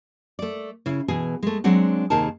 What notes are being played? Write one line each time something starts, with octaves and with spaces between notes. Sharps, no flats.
A3 D5
C#3 E4
B2 E3 G#4
G#3 A3
F#3 G#3 C4 D4 F#5
D#2 C3 D#4 G#4 A#4 A5